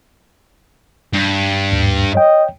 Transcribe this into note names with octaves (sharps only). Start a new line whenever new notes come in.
G2
D#2 G#2
C#5 D#5 G5